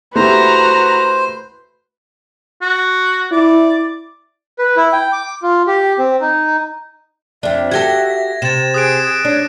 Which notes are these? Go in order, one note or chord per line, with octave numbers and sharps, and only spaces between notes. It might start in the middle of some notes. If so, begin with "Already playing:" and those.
A3 E4 F#4 G4 B4 C5 A#5
F#4
E4 D5
B4
E4
G5
D6
F4
G4
C4
D#4
F2 D4 E5
F#4 G4 A4 G#6 A#6
C3 A6 E7
G#4 D#6 F#6 D7
D4 C#5